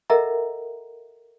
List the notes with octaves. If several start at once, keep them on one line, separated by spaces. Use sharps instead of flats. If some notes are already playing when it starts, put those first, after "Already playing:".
A4 A#4 D#5 E5 F#5 A#5